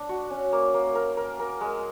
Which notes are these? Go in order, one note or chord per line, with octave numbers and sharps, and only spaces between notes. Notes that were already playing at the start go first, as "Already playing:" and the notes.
Already playing: D4
F#4
C#4
A#3
A#3
A#4
A#4
A#4
G#3